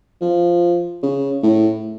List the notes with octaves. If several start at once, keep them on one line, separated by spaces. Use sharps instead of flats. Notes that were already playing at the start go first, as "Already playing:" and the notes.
F3
C#3
A2